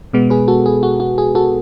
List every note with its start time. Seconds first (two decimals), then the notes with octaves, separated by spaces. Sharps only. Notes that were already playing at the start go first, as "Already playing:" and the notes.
0.13 B2 G#3 B3
0.30 G#4 B4
0.48 F#4 A4
0.66 G#4
0.83 F#4
1.00 F#4
1.18 G#4
1.35 F#4 A4